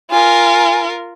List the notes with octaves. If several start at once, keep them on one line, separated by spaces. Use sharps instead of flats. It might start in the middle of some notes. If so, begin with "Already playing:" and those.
F4 A#4 G#5